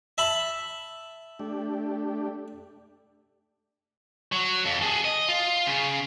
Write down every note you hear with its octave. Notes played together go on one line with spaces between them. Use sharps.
E5 A5 B5
A3 D4 G4
F#3
F2
G#4 A4
D#5
F4
C#3